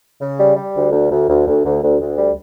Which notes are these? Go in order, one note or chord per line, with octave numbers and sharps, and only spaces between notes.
C#3
G3
G3
D2
D2
D2
D2
D2
D2
D2
D2
G3